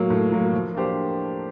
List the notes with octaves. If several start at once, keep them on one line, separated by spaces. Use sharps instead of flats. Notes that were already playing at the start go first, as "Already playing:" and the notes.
Already playing: A2 F#3 A#3
A2
F#3 A#3
F3
A#3 D4 G4 C5